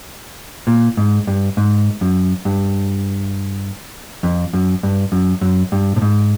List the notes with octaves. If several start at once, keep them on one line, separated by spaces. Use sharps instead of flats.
A#2
G#2
G2
G#2
F#2
G2
F2
F#2
G2
F#2
F#2
G2
A2
G#2